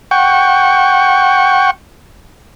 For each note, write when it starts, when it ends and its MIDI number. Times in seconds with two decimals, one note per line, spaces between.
0.11 1.71 78
0.11 1.71 79
0.11 1.71 85